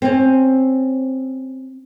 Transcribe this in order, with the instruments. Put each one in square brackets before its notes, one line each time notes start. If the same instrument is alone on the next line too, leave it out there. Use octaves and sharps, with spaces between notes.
[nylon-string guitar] C4 C#4